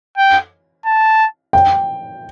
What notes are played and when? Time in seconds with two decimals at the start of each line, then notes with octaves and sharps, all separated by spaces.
0.17 G5
0.86 A5
1.53 G5